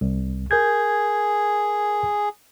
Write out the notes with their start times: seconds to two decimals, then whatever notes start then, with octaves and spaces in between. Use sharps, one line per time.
0.01 C2
0.51 G#4 A#4 G6 G#6